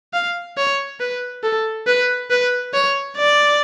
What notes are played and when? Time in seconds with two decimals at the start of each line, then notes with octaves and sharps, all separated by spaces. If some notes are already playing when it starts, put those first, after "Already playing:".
0.13 F5
0.57 C#5
1.00 B4
1.43 A4
1.87 B4
2.30 B4
2.74 C#5
3.17 D5